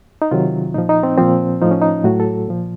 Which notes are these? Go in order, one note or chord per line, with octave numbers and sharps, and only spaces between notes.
D#4
C3 D#3 F#3 F4
A#2 F3 D#4
D#4
C4
A#2 F3 C4
A2 F3 D#4
C#4
D#4
A2 F#3 F#4
A4
A#2 F3